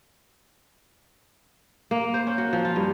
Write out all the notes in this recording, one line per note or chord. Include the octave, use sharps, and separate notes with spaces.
A#3
C5
C#4
F#4
F3
F4
G2